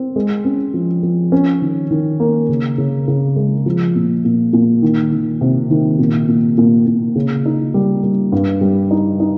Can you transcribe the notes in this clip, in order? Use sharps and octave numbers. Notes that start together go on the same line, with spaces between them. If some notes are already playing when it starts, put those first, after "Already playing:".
Already playing: C4
G#3
C#4
F3
F3
C#4
D#3
D#3
A#3
C#3
C#3
C#3
G#3
F3
A#2
A#2
A#2
D#3
D#3
C3
D#3
A#2
A#2
A#2
A#2
C#3
D#4
G3
G3
G2
G3
D#4
D#4